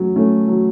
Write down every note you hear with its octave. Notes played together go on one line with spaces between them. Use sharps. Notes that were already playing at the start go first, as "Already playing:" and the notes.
Already playing: F#3 A3 C#4
A3 C#4
F#3